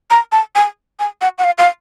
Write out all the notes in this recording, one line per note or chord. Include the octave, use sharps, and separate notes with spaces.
A#5
A5
G#5
G#5
F#5
F#5
F5
F5